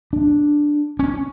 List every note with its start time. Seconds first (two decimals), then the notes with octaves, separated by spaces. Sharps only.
0.13 D4
0.99 C#4